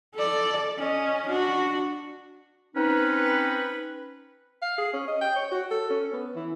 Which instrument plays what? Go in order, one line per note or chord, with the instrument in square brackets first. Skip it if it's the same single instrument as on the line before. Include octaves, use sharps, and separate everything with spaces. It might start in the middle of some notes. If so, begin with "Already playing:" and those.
[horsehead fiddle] A4 D5
C#4 D#5
D4 F#4
[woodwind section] C4 C#4 D#4 B4
[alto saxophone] F5
G#4
C#4
D#5
G5
C#5
F#4
A4
C#4
B3
E3